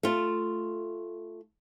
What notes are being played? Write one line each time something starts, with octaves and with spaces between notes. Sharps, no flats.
A3 F4